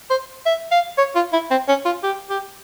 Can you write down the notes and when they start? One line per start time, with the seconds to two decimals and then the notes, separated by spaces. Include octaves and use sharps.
0.10 C5
0.46 E5
0.72 F5
0.98 C#5
1.15 F4
1.33 E4
1.51 C4
1.69 C#4
1.86 F4
2.03 G4
2.30 G4